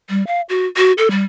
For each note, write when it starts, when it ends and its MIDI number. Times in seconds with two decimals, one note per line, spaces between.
0.10 0.25 55
0.27 0.41 77
0.49 0.67 66
0.77 0.92 66
0.98 1.08 69
1.11 1.24 55